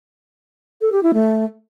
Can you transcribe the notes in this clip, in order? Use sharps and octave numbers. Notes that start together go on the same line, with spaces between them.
A4
G4
E4
A3